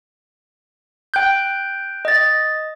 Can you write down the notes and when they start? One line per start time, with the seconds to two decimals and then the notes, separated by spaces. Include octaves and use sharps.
1.14 G5 F#6 G6
2.05 D#5 A6